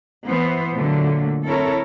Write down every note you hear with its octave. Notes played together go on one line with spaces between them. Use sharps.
E3 B3 C5
A#2 D3 F#3 A3
C4 E4 A4 A#4 C#5